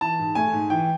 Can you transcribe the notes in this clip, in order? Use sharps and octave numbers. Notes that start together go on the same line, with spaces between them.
E3 A5
G#2
A3 G#5
G#2
E3 G5